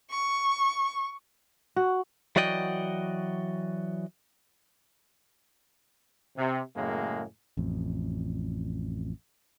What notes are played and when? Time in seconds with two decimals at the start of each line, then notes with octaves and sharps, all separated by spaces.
0.11 C#6
1.76 F#4
2.36 E3 F#3 F#4 D5 D#5 G5
6.37 C3
6.76 F#2 A2 C#3 G#3 A#3
7.57 A1 F2